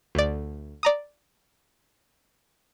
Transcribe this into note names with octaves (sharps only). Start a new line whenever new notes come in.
D2 D5
D5 A#5 D#6